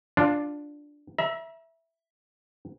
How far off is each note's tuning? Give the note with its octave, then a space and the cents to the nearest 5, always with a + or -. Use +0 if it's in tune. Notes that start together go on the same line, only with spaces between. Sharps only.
D4 +0 F4 +5
E5 +0 A#5 +45